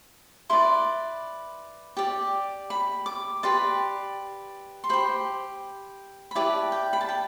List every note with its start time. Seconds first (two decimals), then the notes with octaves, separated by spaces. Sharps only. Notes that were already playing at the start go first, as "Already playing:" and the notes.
0.50 E4 B4 D5 C6
1.97 G4 D5
2.70 B5
3.06 D6
3.43 G4 B4 D5 C6
4.84 C6
4.89 G4 C5 B5
6.31 B5
6.35 E4 G4 B4 D5 A5
6.72 G5
6.93 B5
7.01 A5
7.09 G5